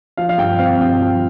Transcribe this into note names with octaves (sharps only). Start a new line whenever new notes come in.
F3 F5
F5
G2 G5
C4 F5
G2 G5
F3